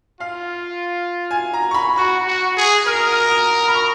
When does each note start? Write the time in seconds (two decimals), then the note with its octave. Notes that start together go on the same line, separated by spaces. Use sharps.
0.20 F4 F5
1.31 G#5
1.53 A#5
1.71 C#6
1.74 B5
1.97 F#4 C#6
2.27 F#4
2.57 G#4
2.86 A#4 F6
2.99 D#6
3.12 F6
3.30 D#6
3.68 B5
3.75 C#6